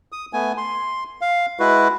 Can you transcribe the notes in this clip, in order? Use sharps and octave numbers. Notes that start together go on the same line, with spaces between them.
D#6
A3 B3 G#5
C6
F5
G#3 E4 F#4 B4